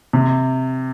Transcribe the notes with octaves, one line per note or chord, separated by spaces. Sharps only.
C3